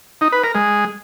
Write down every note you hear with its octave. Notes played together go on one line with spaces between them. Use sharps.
D#4
B4
A#4
G#3